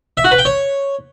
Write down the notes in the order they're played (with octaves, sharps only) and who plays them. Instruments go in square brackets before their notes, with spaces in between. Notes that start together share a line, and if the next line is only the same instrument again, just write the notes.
[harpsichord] E5
F#4
B4
G5
C#5